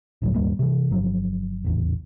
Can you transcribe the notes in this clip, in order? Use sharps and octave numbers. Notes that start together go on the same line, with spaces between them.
G#1 D2 A2 F#3
D#2 G#2 G3 A#3
C3 E3
G1 G2 F3 F#3
D#1 A1 E2